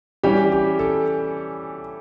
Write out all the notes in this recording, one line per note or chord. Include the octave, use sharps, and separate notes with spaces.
E3 G3 C#4 G4
G4
A4